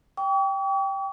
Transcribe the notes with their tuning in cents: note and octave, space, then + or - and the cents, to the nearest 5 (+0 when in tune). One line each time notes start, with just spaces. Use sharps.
G5 +0 C#6 +45